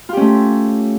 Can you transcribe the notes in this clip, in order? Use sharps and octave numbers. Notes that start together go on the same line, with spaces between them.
A3 C#4 F4 G4